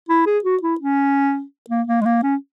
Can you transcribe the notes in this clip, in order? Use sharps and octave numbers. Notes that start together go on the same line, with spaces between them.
E4
G#4
F#4
E4
C#4
A#3
A#3
G#3
A#3
C#4